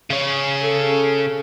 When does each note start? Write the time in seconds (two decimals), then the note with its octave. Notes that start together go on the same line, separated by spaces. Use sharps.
0.10 C#3 C#4
0.62 A4